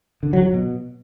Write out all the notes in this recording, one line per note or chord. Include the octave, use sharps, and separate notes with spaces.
D3
F#3
F#3
B2